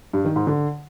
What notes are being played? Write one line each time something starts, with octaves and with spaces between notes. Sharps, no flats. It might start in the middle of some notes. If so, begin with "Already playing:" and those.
G2
D#3
G#2
D3